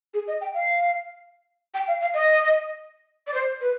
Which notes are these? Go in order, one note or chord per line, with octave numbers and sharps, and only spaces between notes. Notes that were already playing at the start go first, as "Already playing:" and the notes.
G#4
D#5
G5
F5
G5
F5
F5
D#5
D5
C5
B4